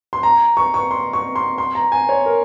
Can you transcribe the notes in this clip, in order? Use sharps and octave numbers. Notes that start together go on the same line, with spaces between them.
C6
A#5
C#6
C#6
C6
C#6
C6
C6
A#5
G#5
C#5
A#4